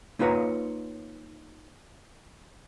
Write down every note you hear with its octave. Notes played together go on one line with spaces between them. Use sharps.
A#3 D#4 F4 B4 C#5 A#5